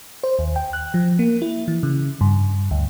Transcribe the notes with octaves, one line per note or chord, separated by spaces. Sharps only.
C5
D#2
G5
F#6
F3
A#3
E4
E3
C#3
G2
D2